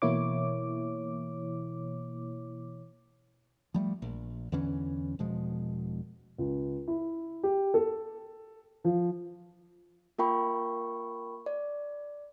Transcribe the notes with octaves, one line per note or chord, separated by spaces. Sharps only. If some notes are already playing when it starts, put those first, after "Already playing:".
B2 E3 A#3 E4 C#5 D6
F3 G3 A3
A#1
E2 D3 E3 C#4
E1 B2 F3 G#3
C#2
E4
G4
A4
F3
A#3 F4 A#4 G5 B5 C#6
D5